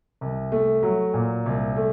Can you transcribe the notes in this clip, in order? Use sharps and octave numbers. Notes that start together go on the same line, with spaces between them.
C2
A3
F#3
A#2
C2
A3